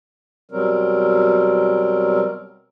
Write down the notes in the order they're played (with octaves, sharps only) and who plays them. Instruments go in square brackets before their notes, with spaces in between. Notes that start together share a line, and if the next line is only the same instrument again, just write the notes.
[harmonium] B2 F#3 G3 C4 A#4